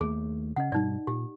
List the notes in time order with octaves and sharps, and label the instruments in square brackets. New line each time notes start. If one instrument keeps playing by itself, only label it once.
[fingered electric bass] D#2 A3 [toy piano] G#4
[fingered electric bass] C#3 C#4 [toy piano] D#5 F#5
[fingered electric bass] G2 B2 G3 [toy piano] D#4 D5
[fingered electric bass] A#2 [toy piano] G4